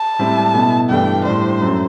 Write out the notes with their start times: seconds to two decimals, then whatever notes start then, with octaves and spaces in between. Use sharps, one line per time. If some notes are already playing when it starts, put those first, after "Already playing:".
Already playing: A5
0.19 A2 G3 C4 E4
0.54 B2 A3 E4
0.90 G2 E3 A3 D4 G5
1.25 A2 G3 D4 C5
1.62 F#2 F#3 A3